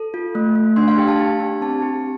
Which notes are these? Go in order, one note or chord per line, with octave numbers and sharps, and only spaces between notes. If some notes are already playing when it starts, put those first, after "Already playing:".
Already playing: A4
F4
A3
A3
D4 C6
F5
G4 G5
A5
G4
D4
C4 A5
G4